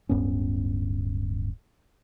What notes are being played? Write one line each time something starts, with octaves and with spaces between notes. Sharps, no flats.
D1 G2 B3 C#4